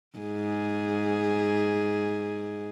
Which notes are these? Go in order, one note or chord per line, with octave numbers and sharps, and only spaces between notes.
G#2 G#4